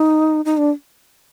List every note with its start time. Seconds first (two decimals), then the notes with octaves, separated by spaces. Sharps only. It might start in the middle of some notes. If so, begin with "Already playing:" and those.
Already playing: D#4
0.45 D#4
0.57 D4